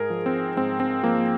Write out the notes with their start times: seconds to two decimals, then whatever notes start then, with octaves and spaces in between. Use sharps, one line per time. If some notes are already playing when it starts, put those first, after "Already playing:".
Already playing: G#2 G#4 A#4
0.10 F3
0.26 C4
0.56 G#2 C4
0.80 C4
1.03 F3 A#3